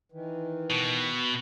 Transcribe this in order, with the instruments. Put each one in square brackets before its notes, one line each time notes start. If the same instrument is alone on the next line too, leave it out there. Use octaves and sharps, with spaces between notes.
[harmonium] D#3 E3
[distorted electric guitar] B2